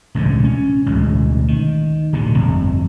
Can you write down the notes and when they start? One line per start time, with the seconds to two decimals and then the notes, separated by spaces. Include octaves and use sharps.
0.15 E1 C#2 A2 D3
0.44 C#4
0.86 A1 D2 B2 G#3
1.48 D#3
2.13 D1 B2 D3
2.35 G1 F2